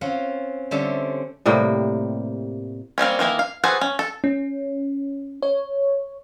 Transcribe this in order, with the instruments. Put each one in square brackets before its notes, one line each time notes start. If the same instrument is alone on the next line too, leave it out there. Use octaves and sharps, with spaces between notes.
[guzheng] C4 C#4 F4 F5 F#5
D3 G3 C4 C#4 E5 A5
[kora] A2 C3 G3 A#3
[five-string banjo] G3 A#3 C4 C#4
D#3 E3 A#3 E4
F5
F#4 G#4 A4 B4 C5
C#4
A4
[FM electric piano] C#4
C#5